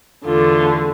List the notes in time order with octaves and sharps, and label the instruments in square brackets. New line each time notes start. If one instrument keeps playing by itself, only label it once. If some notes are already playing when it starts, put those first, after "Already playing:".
[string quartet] E2 D3 A3 F4